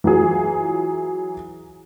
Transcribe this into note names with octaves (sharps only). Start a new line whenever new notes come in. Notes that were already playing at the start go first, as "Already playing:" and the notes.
E3 F#3 F4 G#4